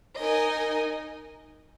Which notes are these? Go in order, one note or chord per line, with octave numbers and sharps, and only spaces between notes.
D#4 A#4 D#5 G#5